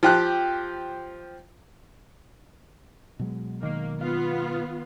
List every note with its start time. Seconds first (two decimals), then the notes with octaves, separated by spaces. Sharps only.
0.03 F3 G4 F#6
3.19 B2 F#3 G#3
3.63 D#3 A#3 C7
4.01 B3 F4 F5